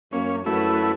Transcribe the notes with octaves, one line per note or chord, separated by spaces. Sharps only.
F#2 A#3 C#4
F#2 A3 E4 F#4 B4